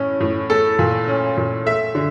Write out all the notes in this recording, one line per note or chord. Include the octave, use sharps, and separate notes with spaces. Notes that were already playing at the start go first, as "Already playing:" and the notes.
Already playing: A2 C#4
A2
A3 A4
A#2
C#4
A#2
A3 E5
D3